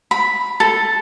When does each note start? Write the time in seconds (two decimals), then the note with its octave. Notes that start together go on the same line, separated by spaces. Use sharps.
0.11 B5
0.60 A4